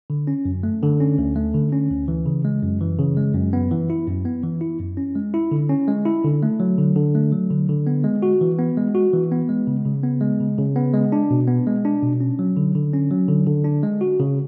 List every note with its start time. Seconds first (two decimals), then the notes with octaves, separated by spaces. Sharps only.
0.10 D3
0.27 C#4
0.45 F#2
0.63 A3
0.83 D3
1.00 C#4
1.18 D2
1.36 A3
1.54 D3
1.72 C#4
1.90 D2
2.08 E3
2.26 C#3
2.45 G#3
2.63 F#2
2.81 E3
2.99 C#3
3.17 G#3
3.34 F#2
3.53 B3
3.71 E3
3.90 E4
4.07 F#2
4.25 B3
4.43 E3
4.61 E4
4.80 F#2
4.97 C#4
5.15 G#3
5.34 E4
5.51 D3
5.69 C#4
5.88 G#3
6.05 E4
6.24 D3
6.43 A3
6.60 F#3
6.78 D3
6.96 D3
7.15 A3
7.32 F#3
7.51 D3
7.69 D3
7.87 B3
8.04 G#3
8.22 F#4
8.41 E3
8.58 B3
8.77 G#3
8.95 F#4
9.13 E3
9.32 B3
9.49 G#3
9.67 C#3
9.85 C#3
10.03 B3
10.21 G#3
10.40 C#3
10.58 C#3
10.76 B3
10.94 G#3
11.12 D4
11.30 B2
11.48 B3
11.67 G#3
11.85 D4
12.02 B2
12.21 C#4
12.39 F#3
12.57 D3
12.75 D3
12.93 C#4
13.11 F#3
13.28 D3
13.47 D3
13.64 D4
13.83 G#3
14.01 F#4
14.20 C#3